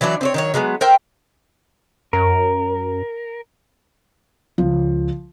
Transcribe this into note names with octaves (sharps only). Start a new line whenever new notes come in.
E3 F#3 B3 D4
C4 C5 C#5
D#3 F#3 C#5
D3 F#3 G#3 B3
A#4 C5 E5 G5
F#2 A#4
C#2 F3